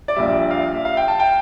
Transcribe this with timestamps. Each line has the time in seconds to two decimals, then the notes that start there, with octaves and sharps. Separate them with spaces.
0.08 D5
0.16 A#1 A#2 G3 E5
0.51 F5
0.75 E5
0.85 F5
0.97 G5
1.08 A5
1.20 G5